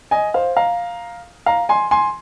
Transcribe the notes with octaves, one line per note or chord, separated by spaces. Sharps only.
D#5 G#5
C5 F5
F5 A#5
F5 A#5
G#5 C6
G#5 C6